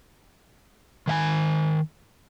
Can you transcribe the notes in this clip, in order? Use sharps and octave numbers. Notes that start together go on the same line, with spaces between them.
D#3 E5 G#5